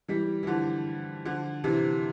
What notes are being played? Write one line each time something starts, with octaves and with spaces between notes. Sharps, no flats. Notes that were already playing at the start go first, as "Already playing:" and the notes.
E3 G3
E3
D3 F3
D3 F3
C3 E3